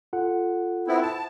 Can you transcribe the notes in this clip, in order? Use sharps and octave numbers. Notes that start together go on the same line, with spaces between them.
F4 A4 F#5
B3 C4 E4
A5